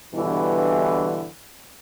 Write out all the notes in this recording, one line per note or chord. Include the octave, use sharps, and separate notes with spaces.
G2 B2 D3 E3